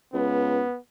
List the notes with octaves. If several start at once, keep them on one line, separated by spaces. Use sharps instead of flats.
C#2 B3